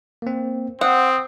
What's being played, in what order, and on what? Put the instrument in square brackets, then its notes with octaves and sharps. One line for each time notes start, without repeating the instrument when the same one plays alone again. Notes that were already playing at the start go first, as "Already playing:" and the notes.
[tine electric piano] A#3 C4
[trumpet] C4 [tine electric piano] C5 [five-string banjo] F#5 [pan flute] D#6